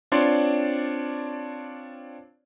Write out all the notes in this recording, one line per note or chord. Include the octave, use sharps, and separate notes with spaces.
C4 D4 F4 C#5 D5 C6